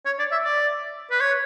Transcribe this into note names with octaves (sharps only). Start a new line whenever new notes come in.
C#5
D5
E5
D5
B4
C#5